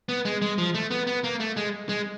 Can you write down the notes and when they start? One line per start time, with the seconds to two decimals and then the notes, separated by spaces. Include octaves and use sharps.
0.09 B3
0.25 G#3
0.42 G#3
0.58 F3
0.74 A3
0.91 B3
1.07 B3
1.24 A#3
1.40 A3
1.57 G#3
1.89 G#3